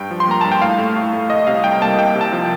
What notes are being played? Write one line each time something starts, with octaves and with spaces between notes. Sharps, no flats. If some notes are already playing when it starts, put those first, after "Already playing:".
Already playing: G2 G5
F3
C6
A#3 A#5
G2 A5
G5
A2 F5
A3
A2
A3
C2 D#5
C3 F5
G3 G5
A#3 A5
C2 G5
C3
A5
F3